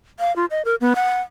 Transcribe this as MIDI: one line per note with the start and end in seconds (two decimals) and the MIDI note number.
0.20 0.35 77
0.36 0.46 65
0.51 0.62 75
0.65 0.75 70
0.81 0.93 59
0.95 1.21 78